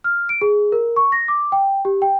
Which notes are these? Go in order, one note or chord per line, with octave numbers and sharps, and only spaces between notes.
F6
D7
G#4
A#4
C#6
A#6
D6
G5
G4
G5